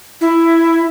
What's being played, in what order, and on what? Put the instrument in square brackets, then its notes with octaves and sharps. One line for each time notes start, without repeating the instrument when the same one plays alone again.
[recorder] E4